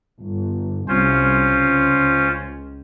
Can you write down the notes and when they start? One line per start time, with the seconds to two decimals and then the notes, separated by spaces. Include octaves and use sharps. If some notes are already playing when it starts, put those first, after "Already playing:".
0.19 G1
0.88 C2 C#4 F4 C5
1.44 C#2